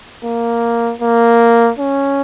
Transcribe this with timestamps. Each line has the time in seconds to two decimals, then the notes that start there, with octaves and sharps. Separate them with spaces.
0.24 A#3
1.02 A#3
1.79 C#4